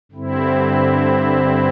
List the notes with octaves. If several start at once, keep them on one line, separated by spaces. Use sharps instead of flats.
G2 D3 C4 E4